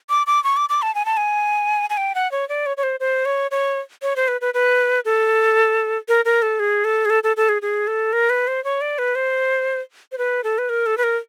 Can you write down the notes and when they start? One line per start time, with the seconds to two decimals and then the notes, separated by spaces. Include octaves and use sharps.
0.09 D6
0.27 D6
0.44 C#6
0.57 D6
0.69 D6
0.82 A5
0.95 G#5
1.05 A5
1.17 G#5
1.90 G#5
1.97 G5
2.15 F#5
2.32 C#5
2.49 D5
2.66 C#5
2.77 C#5
2.83 C5
3.00 C5
3.25 C#5
3.51 C#5
4.02 C#5
4.16 C5
4.28 B4
4.41 B4
4.54 B4
5.05 A4
6.08 A#4
6.25 A#4
6.42 A4
6.60 G#4
6.84 A4
7.05 G#4
7.10 A4
7.23 A4
7.37 A4
7.49 G#4
7.62 G#4
7.87 A4
8.13 A#4
8.30 B4
8.47 C5
8.64 C#5
8.81 D5
8.98 B4
9.15 C5
10.12 C5
10.18 B4
10.44 A4
10.58 B4
10.69 A#4
10.86 A4
10.98 B4
11.03 A#4